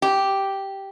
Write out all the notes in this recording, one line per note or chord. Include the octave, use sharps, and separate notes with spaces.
G4